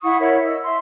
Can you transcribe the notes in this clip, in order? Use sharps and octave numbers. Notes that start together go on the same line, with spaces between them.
E4 F#5 C#6 D#6
E4 A#4 C#5 E5
D#5 E6
E5 C6